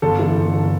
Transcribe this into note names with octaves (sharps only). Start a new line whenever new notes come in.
G1 A4
E3
G1
G1